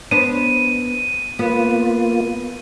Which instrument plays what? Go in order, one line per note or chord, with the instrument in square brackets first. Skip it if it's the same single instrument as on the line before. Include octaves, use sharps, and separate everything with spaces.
[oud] B3 D4 C5 [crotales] D#7
[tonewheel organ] A#3 F4 [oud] B3